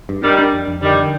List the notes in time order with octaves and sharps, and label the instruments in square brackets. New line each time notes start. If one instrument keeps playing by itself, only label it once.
[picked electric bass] G2
[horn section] D#3 G3 [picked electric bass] D4
[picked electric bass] D4
F2
F2
[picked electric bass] D3 [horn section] D#3 G3
[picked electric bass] D3